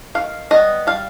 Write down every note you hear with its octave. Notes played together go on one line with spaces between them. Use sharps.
D#3 F5
G3 B3 D#5
G3 F5